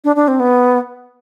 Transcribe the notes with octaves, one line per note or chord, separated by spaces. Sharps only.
D4
D4
C4
B3